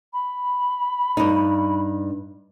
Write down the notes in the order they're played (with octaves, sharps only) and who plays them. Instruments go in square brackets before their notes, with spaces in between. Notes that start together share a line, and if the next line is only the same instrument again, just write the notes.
[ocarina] B5
[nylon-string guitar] G2 D#4